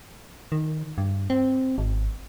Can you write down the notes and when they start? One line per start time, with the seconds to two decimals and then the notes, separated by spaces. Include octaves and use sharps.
0.52 D#3
0.98 G2
1.30 C4
1.78 G#1